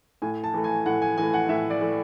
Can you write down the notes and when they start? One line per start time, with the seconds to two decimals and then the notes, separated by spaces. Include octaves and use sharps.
0.22 A2 G#5
0.44 A5
0.54 E3 A3
0.64 G#5
0.86 A2 F#5
1.02 G#5
1.18 E3 A3 G#5
1.33 F#5
1.49 A2 E5
1.70 D5
1.81 E3 A3